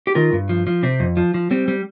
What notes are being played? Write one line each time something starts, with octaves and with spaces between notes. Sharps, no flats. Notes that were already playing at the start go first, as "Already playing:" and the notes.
G4
D#3 F4 A#4
G2
F3
F3
C3 C4
F2
F3
F3
G3 C4
G3